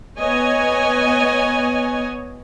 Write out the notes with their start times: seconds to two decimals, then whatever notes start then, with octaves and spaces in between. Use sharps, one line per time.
0.20 B3 C#5 D#5 G#5